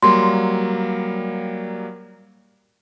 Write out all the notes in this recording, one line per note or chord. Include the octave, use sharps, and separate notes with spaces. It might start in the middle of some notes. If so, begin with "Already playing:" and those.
F#3 G3 A#3 C6